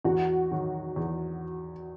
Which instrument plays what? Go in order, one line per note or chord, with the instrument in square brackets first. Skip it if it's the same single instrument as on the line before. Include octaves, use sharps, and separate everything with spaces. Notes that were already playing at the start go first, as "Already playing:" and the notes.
[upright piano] E2 [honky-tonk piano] F#4 F#5
[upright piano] D#3 F#3
E2